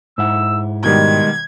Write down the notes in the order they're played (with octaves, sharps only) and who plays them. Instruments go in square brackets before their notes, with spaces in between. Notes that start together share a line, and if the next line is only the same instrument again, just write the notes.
[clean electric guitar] G#2 E4 F#5 [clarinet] E6
[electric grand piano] B2 D#3 G3 [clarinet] G#3 [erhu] G#6